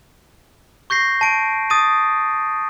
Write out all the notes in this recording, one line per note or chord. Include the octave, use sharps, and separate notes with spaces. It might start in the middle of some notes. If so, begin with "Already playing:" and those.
C#6 G6 A#6 C7
A5 D7
D#6 A6 D#7